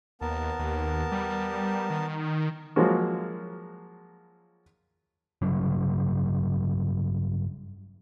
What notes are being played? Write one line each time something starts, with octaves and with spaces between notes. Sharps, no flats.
D#2 B3 A#4 A5
D#2
G3
D#3
F3 F#3 G#3 A#3 F#4
G2 C#3 F#3